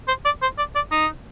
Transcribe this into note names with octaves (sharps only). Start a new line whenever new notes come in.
C5
D5
C5
D5
D5
D#4